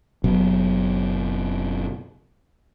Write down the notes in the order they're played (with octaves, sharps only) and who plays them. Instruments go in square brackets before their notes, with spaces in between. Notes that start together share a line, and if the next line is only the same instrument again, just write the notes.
[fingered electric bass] F#1 B2 F#3